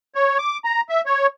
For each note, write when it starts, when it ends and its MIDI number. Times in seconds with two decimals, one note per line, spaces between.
0.15 0.38 73
0.39 0.58 86
0.65 0.81 82
0.89 1.01 76
1.06 1.27 73